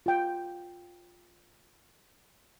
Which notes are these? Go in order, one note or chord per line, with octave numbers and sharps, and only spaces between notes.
F4 G5